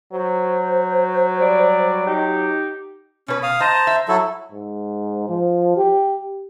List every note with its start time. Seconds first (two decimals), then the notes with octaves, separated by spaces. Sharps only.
0.13 F#3 C5
1.40 G3 D5
2.06 D#4 G4
3.28 B2 C#4 B4
3.43 F5 D#6
3.60 C5 D#5 A5 A#5
3.87 E5
4.08 F#3 E4 A4
4.52 G#2
5.29 F3
5.77 G4